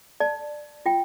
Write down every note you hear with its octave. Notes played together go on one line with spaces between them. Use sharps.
D5 A5
F4 G5